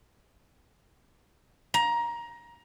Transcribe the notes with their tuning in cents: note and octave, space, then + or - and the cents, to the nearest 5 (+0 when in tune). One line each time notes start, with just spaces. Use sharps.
A#5 +20